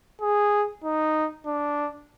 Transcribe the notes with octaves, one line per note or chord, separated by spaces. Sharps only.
G#4
D#4
D4